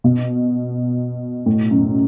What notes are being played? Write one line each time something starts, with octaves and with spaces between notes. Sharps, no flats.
B2
A2
F#2